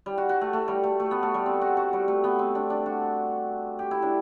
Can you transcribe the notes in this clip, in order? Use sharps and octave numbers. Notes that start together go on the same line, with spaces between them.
G3
F#4
F#4
A3
A3
G3
A3
A3
B3
A3
G3
C4
F#4
F#4
G3
A3
B3
C4
D4
D4
F#4
G4
E4
D4